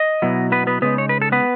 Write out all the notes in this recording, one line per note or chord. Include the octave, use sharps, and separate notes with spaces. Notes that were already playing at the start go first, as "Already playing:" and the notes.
Already playing: D#5
B2 F#3 B3 E4
B3 B4
B3 B4
C#3 G#3 B3 D#4 B4
C#5
B4
A4
B3 B4